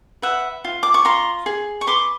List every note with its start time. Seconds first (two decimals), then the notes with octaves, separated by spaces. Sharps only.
0.22 B4 E5 F#5
0.64 F4
0.83 D6
0.94 C#6
1.05 F4 A#5 C6
1.46 G#4
1.81 C#6
1.87 B4 C6 D6